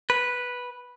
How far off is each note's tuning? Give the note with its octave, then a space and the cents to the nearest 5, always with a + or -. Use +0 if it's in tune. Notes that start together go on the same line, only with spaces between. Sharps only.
B4 -5